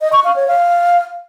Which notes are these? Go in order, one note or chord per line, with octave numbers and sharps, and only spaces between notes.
D#5
C#6
F5
C#5
F5